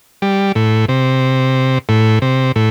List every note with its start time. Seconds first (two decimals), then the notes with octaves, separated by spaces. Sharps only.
0.22 G3
0.55 A2
0.88 C3
1.89 A2
2.22 C3
2.56 A2